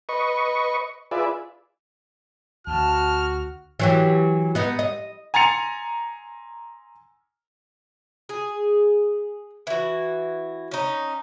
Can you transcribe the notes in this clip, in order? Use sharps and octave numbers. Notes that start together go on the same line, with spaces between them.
B4 D#5 C#6
F4 G#4 B4 D5 E5
D2 F#4 A5 F6
E3 F#3 G4
B3 D#4
D#5
G#5 A#5 C6 A6 C#7 F7
G#4
E3 F#4
C#4 D#4